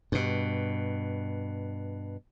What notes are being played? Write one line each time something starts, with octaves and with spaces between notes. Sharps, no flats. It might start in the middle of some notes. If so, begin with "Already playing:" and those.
G2 B2